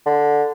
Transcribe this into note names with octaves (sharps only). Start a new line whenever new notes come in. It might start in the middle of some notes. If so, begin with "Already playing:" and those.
D3